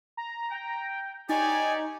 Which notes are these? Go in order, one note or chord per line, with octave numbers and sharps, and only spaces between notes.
A#5
G5
D#4 G4 C#5 D5 G#5